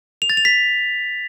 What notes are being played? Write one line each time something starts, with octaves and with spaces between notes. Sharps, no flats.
F7
A6
F7
B6